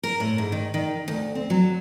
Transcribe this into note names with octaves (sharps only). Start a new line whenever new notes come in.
A#4
A2
G#2
D#3
D#3
D2
C4
F#3